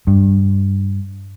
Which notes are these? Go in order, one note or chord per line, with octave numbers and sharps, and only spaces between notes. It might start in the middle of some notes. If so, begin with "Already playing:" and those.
G2